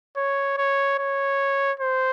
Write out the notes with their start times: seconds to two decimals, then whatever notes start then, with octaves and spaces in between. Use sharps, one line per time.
0.16 C#5
0.57 C#5
0.99 C#5
1.80 C5